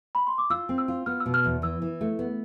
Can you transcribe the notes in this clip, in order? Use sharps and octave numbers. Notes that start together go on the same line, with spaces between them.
B5
C6
D6
F4 E6
C4
E6
F4
B3 F6
E6
B2
F6
E2
E3 E6
E3
A3
B3